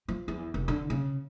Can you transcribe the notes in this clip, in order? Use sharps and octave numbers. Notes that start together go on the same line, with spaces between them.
F3
E2
F1
D3
C#3